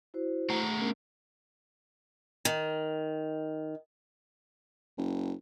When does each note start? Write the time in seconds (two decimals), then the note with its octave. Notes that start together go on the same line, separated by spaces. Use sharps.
0.14 E4 F#4 C5
0.50 A3 F#5 A#5
0.77 B3 C#4 A#4
2.45 D#3
4.98 F#1